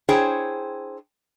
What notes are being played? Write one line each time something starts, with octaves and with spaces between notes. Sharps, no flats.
D4 E4 G#4 C5 C#5 G5